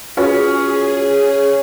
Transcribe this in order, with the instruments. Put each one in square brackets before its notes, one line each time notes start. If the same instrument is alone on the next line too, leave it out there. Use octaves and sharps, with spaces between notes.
[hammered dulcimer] C#4 [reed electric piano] F4 F#4 B4 [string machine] G#4